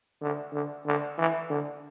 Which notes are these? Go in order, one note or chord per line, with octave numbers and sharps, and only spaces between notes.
D3
D3
D3
E3
D3